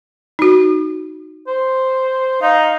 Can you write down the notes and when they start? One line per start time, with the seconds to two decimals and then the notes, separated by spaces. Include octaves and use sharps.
0.39 D#4 F#4
1.47 C5
2.42 D#4 F5